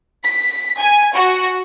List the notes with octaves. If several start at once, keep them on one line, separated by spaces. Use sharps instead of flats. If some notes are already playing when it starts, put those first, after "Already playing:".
B6
G#5
F#4